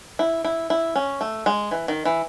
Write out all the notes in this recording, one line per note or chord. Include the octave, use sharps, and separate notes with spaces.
E4
E4
E4
C#4
A3
G#3
E3
D#3
E3